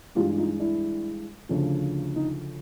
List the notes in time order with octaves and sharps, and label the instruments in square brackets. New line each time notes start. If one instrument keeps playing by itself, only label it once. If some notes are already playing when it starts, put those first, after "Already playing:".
[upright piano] G2 E3 G#3 F4 G4
D#4 F4
D4 E4
D2 C#3 F3
D#4